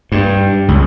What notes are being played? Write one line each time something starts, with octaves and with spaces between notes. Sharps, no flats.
G2
C#2